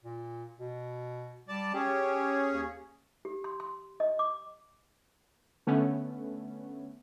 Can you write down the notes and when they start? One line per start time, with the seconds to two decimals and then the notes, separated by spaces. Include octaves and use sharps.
0.04 A#2
0.59 B2
1.48 G3 D5 A5
1.74 C#4 G4 G#4
2.53 D#2
3.25 G4
3.44 C6
3.60 C6
4.00 D#5
4.19 D6
5.67 D3 A3 B3 C#4